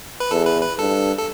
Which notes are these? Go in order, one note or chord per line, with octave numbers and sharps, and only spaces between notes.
B4
E2 A4
B4
B4
G2 A4
A4